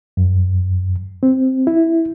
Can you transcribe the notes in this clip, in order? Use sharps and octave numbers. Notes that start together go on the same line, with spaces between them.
F#2
C4
E4